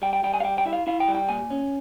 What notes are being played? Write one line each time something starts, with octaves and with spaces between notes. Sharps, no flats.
G3 G5
G5
G3 G5
G#5
F5
G3 G5
G5
E4 E5
F5
E4 F5
G5
G3
G5
A#2 G#5
C#4